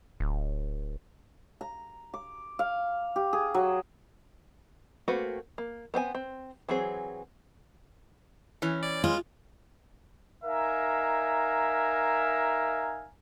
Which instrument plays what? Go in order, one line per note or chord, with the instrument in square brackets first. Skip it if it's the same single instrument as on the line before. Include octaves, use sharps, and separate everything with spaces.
[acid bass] D1
[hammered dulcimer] A#5
D6
F5
G4
G#4
F#3
[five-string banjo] A3 A#3 C4 F#4 B4
A#3
B3 C4 F5 G#5
C4
E3 F#3 C4 G#4
[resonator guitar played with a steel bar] E3 C#4
[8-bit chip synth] D5
[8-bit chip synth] G#3 [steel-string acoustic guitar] F4
[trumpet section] D#4 A#4 E5 F5 G#5 A#5